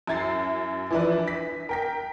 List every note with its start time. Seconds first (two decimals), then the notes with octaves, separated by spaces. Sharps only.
0.07 F#2 E4 G#6 A6 C7
0.91 E3 F3 D4 E4 B4
1.28 B6
1.69 A#4 G5 B6